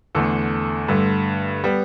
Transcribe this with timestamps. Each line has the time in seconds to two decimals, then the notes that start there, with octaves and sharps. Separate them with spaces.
0.15 E2 D3 A3 A4
0.88 G2 D3 A3
1.64 G3 B3